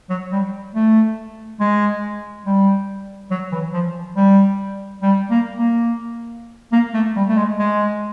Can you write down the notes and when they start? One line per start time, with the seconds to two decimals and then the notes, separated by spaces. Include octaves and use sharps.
0.10 F#3
0.32 G3
0.75 A3
1.60 G#3
2.46 G3
3.31 F#3
3.52 E3
3.73 F3
4.16 G3
5.02 G3
5.30 A#3
5.59 A#3
6.72 A#3
6.94 A3
7.16 G3
7.29 A3
7.37 G#3
7.59 G#3